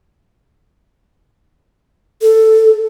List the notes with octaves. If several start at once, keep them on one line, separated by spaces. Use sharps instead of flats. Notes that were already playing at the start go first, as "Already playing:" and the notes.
A4